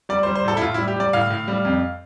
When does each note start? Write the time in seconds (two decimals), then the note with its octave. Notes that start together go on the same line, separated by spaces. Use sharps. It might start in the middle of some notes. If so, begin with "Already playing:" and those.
0.09 G3 D5
0.23 G3 C5
0.35 C5
0.45 A2 A4
0.57 E4
0.61 A2 F4
0.74 G3 E4
0.88 G4
0.96 G3 D5
1.13 A2 F5
1.30 A2
1.48 G3
1.65 F2